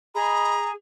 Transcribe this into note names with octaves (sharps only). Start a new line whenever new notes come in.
G#4 D#5 A#5 B5